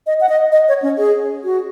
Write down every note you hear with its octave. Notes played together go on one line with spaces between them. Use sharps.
D#5
F#5
D#5
D#5
C#5
C#4
G#4
F#4